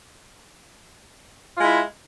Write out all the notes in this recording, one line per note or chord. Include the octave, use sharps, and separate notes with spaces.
G#3 E4 F4